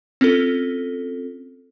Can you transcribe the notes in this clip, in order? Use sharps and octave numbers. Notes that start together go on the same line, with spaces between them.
C4 C#4 F4 A4